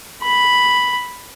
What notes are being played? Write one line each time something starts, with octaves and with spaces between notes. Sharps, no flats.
B5